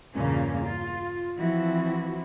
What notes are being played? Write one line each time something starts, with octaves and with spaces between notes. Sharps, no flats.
E2 G2 A#2 C#3 A#3 C#4
F4
E3 F3 C4 E4 F#4